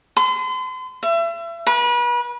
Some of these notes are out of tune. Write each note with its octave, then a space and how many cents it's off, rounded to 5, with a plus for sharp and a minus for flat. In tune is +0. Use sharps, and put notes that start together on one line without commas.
C6 -40
E5 +35
B4 -35